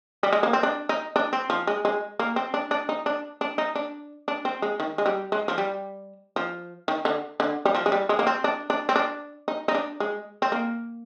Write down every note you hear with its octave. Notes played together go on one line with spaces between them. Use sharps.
G3
G#3
A#3
C4
D4
D#4
D4
C4
F3
G#3
G#3
A#3
C4
D4
D4
D#4
D4
D4
D#4
D4
D4
C4
G#3
D#3
G#3
G3
G#3
F3
G3
F3
D#3
D3
D3
G3
F3
G#3
G3
G#3
A#3
C4
D4
D4
C4
D4
D#4
D#4
D4
G#3
C4
A#3